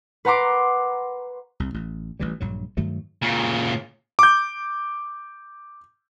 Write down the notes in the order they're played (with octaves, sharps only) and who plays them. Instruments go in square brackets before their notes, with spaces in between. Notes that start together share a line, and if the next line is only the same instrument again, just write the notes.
[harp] B4 F#5 A#5 C6 D6
[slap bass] C2
A1
A1 E3 G3
A#1 G2 F#3
G2 D#3 F#3 A3
[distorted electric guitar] A#2 C#3
[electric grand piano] D6 G6